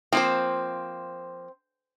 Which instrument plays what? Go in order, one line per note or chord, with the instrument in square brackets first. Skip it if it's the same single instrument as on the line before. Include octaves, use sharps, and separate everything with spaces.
[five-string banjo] F3 A#3 C5 [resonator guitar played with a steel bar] C4